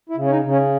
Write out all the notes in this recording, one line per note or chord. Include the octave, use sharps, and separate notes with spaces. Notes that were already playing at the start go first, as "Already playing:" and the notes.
E4
C#3
C#4
D#4
C#3
C#4